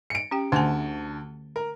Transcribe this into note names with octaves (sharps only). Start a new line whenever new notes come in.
C#7 D7
C#4 G4 G5
D2 D3 A3 G#5 A5
A#4